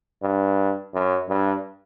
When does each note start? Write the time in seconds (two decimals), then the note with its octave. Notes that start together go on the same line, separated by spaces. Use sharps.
0.23 G2
0.94 F#2
1.29 G2